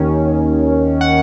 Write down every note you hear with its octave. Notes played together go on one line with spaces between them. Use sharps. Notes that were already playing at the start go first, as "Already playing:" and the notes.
Already playing: D#2 D#3 C#4
F#5